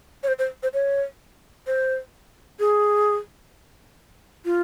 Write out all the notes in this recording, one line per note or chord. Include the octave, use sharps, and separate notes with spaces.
C#5
C5
C5
C5
C#5
C5
G#4
F4